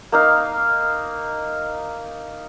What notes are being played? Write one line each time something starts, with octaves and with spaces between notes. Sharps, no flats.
A#3 D#4 F5